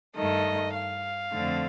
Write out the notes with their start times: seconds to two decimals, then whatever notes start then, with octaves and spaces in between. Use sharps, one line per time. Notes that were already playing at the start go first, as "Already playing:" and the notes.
0.16 G2 D#3 A3 D#5
0.74 F5
1.32 F2 D3 A3 C4